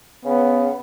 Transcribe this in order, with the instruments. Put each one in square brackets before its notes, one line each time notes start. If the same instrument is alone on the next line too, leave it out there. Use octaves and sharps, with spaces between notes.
[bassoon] C#3 [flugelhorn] B3